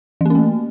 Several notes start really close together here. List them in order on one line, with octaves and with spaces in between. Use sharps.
E3 A#3 C#4 A3